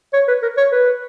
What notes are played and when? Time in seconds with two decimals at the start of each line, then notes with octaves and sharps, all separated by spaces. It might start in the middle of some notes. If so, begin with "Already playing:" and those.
0.14 C#5
0.28 B4
0.43 A#4
0.57 C#5
0.72 B4